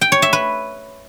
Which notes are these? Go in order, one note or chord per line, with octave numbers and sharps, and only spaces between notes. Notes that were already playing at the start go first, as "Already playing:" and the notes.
G5
C#5
E5
B4